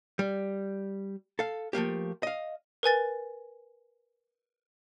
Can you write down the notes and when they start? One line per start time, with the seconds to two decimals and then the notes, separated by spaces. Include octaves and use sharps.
0.19 G3
1.39 A4 F5
1.73 F3 A3 A#3 G4
2.23 D#5 F5
2.83 A#4 B4 G#5 A6